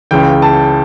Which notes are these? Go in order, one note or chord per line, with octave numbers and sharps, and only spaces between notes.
C#2 C#3 E3 G5
A5